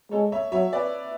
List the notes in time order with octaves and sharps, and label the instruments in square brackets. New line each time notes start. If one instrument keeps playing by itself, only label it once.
[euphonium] G#3 [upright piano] A4 C#5
[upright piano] C#5 E5
[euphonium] F#3 [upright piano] C#5 E5
[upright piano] B4 D5